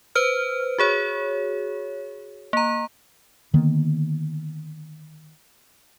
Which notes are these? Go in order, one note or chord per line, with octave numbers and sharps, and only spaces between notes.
B4 C5 F6
F#4 G#4 C#5
A#3 A#5
D3 D#3 A#3 B3